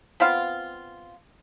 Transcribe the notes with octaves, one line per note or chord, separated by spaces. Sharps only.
B3 C4 F4 F5